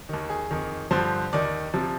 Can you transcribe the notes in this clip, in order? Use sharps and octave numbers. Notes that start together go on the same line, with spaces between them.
D#2 D#3
G#4
F2 D#3
G2 D3 F3 C5
D#2 D#3 D5
C3 F3